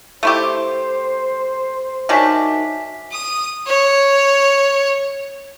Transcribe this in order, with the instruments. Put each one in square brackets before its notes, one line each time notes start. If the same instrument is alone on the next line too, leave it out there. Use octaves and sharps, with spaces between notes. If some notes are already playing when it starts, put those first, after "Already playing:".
[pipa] A3 E4 G4 [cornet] C5
[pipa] D#3 F#3 D4 [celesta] E5 G#5 B6
[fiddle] D#6
C#5